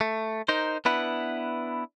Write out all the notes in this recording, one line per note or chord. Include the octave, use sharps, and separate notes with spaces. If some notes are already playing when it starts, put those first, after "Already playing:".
A3
D#4 A#4 C5
B3 D4 E4 B4 F#5